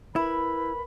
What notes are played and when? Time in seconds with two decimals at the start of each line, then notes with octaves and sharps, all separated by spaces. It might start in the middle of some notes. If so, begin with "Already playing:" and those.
0.16 E4 A#4 B4 B5